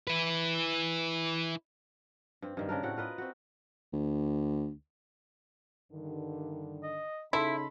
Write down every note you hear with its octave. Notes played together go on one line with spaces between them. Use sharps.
E4 B4
G2 C4
G2 D#3 G3
C#3 C4 D4 A#4
A2 C4 F#4 F#5
F4 A#4 B4 D#5
C4 F#4
D2
G2 D3 D#3
D#5
C#3 D#4 E4 A4 B5 C6